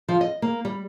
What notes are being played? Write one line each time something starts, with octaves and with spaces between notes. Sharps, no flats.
F3
D#5
A#3
G3